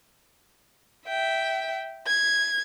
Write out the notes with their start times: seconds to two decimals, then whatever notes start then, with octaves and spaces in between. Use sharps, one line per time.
1.08 E5 G5
2.07 G#6